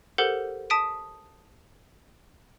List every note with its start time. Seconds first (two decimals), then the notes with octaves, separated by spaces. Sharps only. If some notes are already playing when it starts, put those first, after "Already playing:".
0.18 G4 A4 A#4 C5 F#5 G6
0.70 A5 D#6 B6 D7 D#7